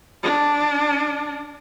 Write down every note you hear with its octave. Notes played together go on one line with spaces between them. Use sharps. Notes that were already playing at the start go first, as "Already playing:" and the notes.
D4